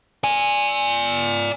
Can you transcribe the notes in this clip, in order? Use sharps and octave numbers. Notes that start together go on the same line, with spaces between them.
D5 G#5